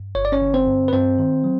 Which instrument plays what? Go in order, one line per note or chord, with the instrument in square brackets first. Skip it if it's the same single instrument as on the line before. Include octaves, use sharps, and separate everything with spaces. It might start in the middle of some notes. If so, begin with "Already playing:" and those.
Already playing: [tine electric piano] G2
G1 C#5
D5
C#4 C#5
D3
C4 C5
G2
B4
G2 C4 C5
D#3
F#3